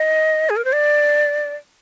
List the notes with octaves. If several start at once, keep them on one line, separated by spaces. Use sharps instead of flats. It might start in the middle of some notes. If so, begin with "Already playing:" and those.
Already playing: D#5
G#4
A#4
C5
D5